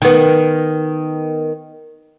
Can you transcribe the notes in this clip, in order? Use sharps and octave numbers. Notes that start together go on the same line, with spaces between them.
D#3 B3